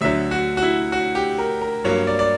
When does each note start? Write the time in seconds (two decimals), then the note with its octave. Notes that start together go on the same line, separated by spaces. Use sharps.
0.01 D2 D3 F#3 E5
0.31 F#4
0.57 F#4
0.63 E4
0.92 F#4
1.15 G4
1.38 A#4
1.61 A#4
1.84 G2 F#3 A#3 C#5
2.07 D5
2.19 D5